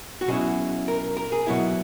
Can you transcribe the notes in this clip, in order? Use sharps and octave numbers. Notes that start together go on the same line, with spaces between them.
F#4
B2 F#3 C#4 E4 G#4
A#4
A#4
G#4
B2 F#3 B3 E4